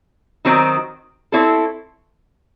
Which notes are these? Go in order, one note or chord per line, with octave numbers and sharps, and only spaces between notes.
D#3 F#3 C4 D#4
C4 E4 A4 C#5